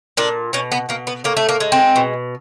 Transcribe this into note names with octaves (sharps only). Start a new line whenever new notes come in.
A#2 D4
B2 C#4
B3
B2 A#3
B3
A2 A#3
A3
A#3
G#3
C4
B2